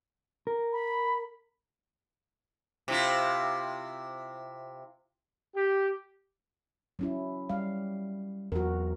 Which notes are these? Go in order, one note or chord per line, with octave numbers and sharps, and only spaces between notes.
A#4
B5
C3 E4 F4
G4
F#3 C#4 E4
G3 F5
E2 F#3 F#4 A#4